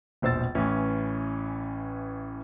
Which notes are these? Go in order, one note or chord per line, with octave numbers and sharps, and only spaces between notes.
E1 A#1 C5 E6 A6
A1 E3 C#4